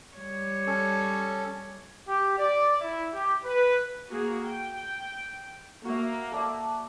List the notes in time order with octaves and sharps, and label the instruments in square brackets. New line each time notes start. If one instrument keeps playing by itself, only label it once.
[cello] G3 C#5
[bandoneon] C#4 A4
[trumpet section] G4
D5
E4
G4
B4
[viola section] A#3 F#4 G#4
G5
[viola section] A#3 [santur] F#4 E5
[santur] A4 D5 E5